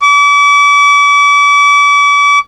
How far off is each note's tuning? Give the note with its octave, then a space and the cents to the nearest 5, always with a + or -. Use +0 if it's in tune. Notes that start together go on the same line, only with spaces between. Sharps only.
D6 -40